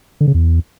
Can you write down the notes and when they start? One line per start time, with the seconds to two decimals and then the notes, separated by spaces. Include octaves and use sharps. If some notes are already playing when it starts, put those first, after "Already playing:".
0.21 D3
0.27 C#3
0.34 E2